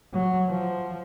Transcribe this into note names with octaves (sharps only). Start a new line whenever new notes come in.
F#3
F3